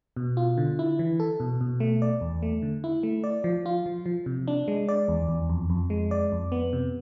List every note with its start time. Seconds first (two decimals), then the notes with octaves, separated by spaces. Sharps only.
0.16 B2
0.37 F4
0.57 D3
0.79 E4
0.99 E3
1.20 A4
1.40 B2
1.61 B2
1.80 A3
2.02 D5
2.21 E2
2.43 A3
2.62 D3
2.84 E4
3.03 A3
3.24 D5
3.44 F3
3.66 F4
3.86 F3
4.06 F3
4.26 C3
4.48 D4
4.68 G#3
4.88 D5
5.08 E2
5.29 E2
5.50 F2
5.70 F2
5.90 G#3
6.11 D5
6.32 F2
6.52 B3
6.73 C3